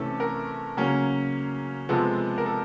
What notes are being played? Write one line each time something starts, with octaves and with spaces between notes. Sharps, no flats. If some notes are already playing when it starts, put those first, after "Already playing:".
Already playing: C3 E3 A3 C#4 A4
A#4
C#3 F#3 A#3 C#4
C3 F3 G#3 B3 A4
A#4
A4